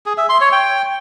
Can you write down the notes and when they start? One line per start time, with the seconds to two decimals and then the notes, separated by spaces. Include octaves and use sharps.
0.06 G#4
0.17 E5
0.29 C6
0.41 C#5
0.52 G5